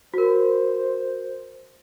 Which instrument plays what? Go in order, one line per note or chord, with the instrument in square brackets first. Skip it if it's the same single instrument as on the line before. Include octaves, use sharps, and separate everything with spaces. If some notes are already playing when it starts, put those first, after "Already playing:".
[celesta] F#4 A#4 [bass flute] C5